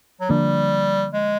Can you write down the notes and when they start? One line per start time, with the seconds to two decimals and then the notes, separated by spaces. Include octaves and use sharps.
0.21 F#3
0.29 D3 F3 G3 A#3 D4
1.14 G#3